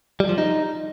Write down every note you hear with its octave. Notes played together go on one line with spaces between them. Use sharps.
G3
F3
D#4